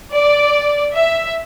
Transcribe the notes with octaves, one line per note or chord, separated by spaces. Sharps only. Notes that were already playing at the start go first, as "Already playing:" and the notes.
D5
E5